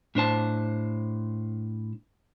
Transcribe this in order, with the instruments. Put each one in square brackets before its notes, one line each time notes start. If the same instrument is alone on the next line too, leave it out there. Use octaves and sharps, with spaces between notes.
[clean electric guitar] A2 D4 C5 A5